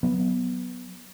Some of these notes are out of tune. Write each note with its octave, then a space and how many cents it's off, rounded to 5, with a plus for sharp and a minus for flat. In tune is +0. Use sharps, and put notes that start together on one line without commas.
F#3 +0 B3 +0